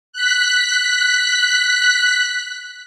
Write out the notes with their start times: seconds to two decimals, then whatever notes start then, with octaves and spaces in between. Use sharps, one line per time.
0.13 F#6 B6